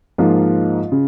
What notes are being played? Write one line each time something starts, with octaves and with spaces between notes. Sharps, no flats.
G#2 F3 A#3 F4
C#3